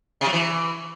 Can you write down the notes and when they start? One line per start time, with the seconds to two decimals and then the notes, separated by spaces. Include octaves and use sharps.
0.21 C3
0.27 F#3
0.33 E3